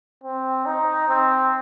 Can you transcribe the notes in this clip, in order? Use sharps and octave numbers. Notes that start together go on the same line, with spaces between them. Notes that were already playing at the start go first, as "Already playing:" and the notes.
C4
D#4
C4